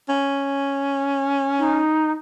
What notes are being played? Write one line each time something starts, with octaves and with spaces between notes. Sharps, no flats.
C#4
D#4